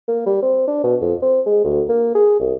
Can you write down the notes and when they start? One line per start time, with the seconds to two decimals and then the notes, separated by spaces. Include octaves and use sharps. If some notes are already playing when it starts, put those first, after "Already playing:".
0.08 A#3
0.26 G3
0.42 C4
0.67 D4
0.84 B2
1.01 F2
1.22 C4
1.46 G#3
1.64 D2
1.89 A#3
2.15 G#4
2.40 C2